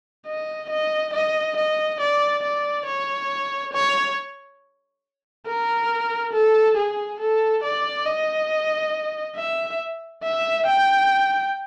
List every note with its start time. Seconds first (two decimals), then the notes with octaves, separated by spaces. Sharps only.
0.27 D#5
0.71 D#5
1.13 D#5
1.57 D#5
2.00 D5
2.43 D5
2.86 C#5
3.73 C#5
5.47 A#4
6.33 A4
6.77 G#4
7.20 A4
7.63 D5
8.06 D#5
9.36 E5
10.23 E5
10.66 G5